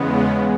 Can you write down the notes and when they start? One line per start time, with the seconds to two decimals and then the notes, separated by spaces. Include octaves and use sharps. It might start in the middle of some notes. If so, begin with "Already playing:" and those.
Already playing: E2 C#3 G#3 B3